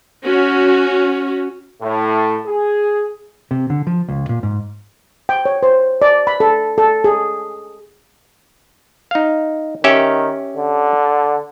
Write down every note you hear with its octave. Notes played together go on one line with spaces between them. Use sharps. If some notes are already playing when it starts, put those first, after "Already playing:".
C#4 F#4
A2
G#4
C3
D3
F3
C#2
A#2
G#2
G5
C#5
C5
D5
B5
A4
A4
G#4
D#4 F5
D#3 C#4 G4 E5
D3